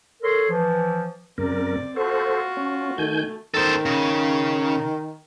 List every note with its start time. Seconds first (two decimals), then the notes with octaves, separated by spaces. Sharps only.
0.23 A4 A#4 C#5 C6
0.49 E3 F3
1.38 F#2 C#3 C4 A#4 D5
1.96 F4 F#4 A4 C5
2.57 C#4
2.98 D#3 A3 G#5 G6
3.54 D#3 A4 C5
3.85 C#3